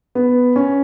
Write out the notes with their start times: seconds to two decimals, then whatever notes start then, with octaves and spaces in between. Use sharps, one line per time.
0.15 B3
0.56 C#4